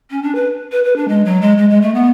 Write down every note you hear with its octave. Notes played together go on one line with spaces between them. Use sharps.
C#4
D4
B4
B4
B4
D4
G#3
F#3
G#3
G#3
G#3
A3
B3